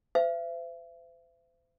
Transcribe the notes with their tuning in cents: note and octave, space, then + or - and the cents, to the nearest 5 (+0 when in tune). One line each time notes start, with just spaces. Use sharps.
C5 -40 E5 +40